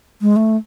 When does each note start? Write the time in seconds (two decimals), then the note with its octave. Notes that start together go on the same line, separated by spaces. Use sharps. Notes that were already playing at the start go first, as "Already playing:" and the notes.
0.21 G#3
0.36 A3